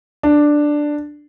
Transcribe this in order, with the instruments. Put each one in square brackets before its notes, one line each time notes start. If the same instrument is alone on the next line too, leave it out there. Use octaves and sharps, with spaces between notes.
[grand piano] D4